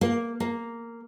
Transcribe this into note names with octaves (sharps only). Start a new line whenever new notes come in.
A#3
A#3